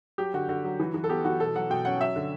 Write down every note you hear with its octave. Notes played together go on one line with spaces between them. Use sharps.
F#3 G4
D3 F#4
D3 F#4
F#3
E3
E3
A4
B3 G4
E3 F#4
B2 A4
F#3 F#5
B2 G5
C#4 F#5
F#3 E5
D3